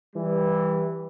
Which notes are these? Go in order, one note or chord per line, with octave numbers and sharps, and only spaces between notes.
E3 G3